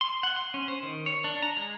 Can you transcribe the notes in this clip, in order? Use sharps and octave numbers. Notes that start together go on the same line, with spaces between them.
C6
F#5
C6
C#4
C5
D#3
C#5
D4
A#5
G#3